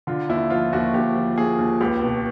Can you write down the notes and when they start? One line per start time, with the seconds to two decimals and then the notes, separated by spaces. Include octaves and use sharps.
0.07 D3 F4
0.29 D#2 E4
0.50 F3 F4
0.73 D#2 F#4
0.94 D#2 G4
1.15 F3
1.38 D#2 G#4
1.59 D#2
1.81 C#2 G4
2.01 B2